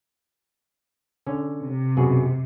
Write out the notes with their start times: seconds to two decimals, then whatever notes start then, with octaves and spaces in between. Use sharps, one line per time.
1.26 D3 C#4
1.61 C3
1.97 F#2 B2 G#4